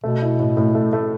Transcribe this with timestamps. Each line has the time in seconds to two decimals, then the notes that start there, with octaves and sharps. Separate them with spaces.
0.04 B2 A3
0.22 E4
0.39 A2
0.57 A2
0.75 A3
0.93 A3